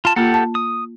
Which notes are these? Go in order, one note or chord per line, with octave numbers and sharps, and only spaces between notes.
F4 A5
A#3 F4 G4 A4 F#5
A5
D#6